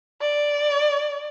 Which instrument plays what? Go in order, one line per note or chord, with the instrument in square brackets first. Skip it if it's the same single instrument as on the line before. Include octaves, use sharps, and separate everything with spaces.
[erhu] D5